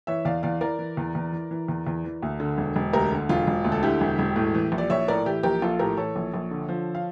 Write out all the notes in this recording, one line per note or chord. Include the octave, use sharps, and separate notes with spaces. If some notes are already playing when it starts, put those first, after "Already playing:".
E3 C#5 E5
E2 D5 F5
E2 D5 F5
E3 A#4 D5
E3
E2
E2
E3
E3
E2
E2
E3
D2
D3
E1
E1
D2 G4 A#4
D3
E1 F4
E1
D2
A4
D3 E4 G4
E1
E1
A2
E3
A#1
D5
A#1 C#5 E5
A2 A#4 D5
E3 E4 G4
A#1 G4 A#4
A#1 F4 A4
A2 G4 A#4
E3 A4 C#5
A#1
A#1
D3
F3
F5